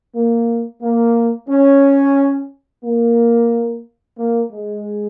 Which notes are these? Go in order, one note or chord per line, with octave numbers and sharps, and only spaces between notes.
A#3
A#3
C#4
A#3
A#3
G#3